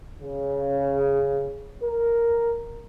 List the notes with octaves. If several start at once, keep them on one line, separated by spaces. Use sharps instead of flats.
C#3
A#4